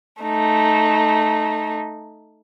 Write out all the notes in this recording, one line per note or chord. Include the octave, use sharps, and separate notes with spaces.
A3 D#4